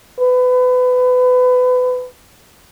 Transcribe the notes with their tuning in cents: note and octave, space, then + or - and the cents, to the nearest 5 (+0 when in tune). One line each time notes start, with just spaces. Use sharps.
B4 +30